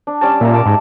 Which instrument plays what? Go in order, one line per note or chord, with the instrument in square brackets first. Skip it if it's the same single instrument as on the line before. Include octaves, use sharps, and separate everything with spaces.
[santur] D4
G3 C#4 A5
[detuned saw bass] A#2 [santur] E5 A#5
[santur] A5 D6
[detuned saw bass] G#2